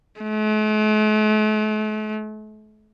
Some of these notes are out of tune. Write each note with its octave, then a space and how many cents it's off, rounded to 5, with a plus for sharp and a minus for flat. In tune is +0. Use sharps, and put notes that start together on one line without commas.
A3 -45